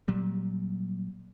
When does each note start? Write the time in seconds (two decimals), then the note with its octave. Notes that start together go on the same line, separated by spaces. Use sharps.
0.08 A#2 F#3 G3